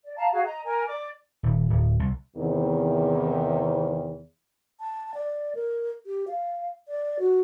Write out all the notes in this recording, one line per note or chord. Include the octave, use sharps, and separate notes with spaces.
D5
F5 A5 A#5
F#4 G#4 F5
D#5 A#5
A#4 G#5
D5 D6
D#1
D1
C2
E2 C3 D#3
A5
D5
A#4
G4
F5
D5
F#4